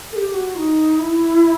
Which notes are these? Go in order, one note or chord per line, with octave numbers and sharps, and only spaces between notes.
A4
G4
F#4
D#4
E4